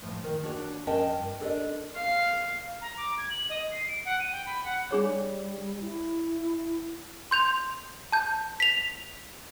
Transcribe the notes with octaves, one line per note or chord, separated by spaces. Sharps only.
A2 F3
D#3
D#2 D4 F#4 C#5
F2 C#4 A#4 D#5 G5 A5
G2
D4 A4 A#4 C5 D5 D#5
F5
A#5
D6
G#6
F#7
D#5
C7
D7
F#5
D#7
G5
B5
F#5
G3 D4 G#4 C#5
E4
C6 G6 F7
A5 G6
B6 F7